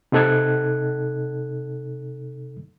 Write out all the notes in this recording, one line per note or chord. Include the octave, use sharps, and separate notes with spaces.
C3 D#4 A4 F#6 G#6